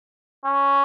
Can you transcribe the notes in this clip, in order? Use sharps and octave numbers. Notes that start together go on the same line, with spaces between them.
C#4